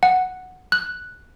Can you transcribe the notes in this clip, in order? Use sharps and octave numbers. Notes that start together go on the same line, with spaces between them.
F#5
F#6